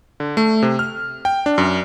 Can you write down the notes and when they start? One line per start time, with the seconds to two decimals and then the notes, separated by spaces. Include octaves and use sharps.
0.20 D3
0.37 A3
0.62 C3
0.79 F6
1.25 G5
1.46 D4
1.58 F#2